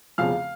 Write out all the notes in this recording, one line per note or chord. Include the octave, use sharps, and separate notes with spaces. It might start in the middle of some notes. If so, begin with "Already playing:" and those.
F1 E2 C#3 F3 F5 F6